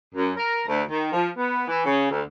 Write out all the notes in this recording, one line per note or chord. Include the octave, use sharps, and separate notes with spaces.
F#2
A#4
D2
D#3
F3
B3
E3
C#3
D2